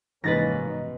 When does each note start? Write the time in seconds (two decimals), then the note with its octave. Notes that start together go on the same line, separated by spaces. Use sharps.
0.24 F1 G#2 E3 A#3 C#4 B4 A6 A#6
0.63 B2